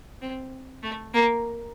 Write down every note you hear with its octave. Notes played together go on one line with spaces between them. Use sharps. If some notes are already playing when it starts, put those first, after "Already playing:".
C4
A3
A#3